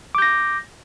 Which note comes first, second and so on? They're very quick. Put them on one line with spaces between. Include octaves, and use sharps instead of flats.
D6 G6 A#6